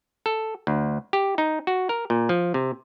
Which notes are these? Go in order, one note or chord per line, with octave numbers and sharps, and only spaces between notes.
A4
D2
G4
D#4
F#4
A#4
A#2
F3
C3